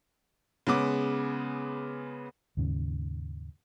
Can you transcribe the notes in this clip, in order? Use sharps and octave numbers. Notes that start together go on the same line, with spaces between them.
C#3 G#3 B3 D6
D#2 G#2 C#3